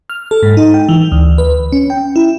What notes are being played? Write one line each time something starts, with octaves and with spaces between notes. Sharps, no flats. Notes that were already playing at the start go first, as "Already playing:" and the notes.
F6
A4
G#2
D#4
G5
E3
D2
B4
C#4
G5
E4